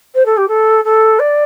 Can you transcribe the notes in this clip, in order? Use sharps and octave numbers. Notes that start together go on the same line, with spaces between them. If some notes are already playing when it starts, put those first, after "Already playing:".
C5
A4
G4
A4
A4
D5